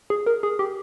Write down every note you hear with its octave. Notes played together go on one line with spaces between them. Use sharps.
G#4
A#4
G#4
G4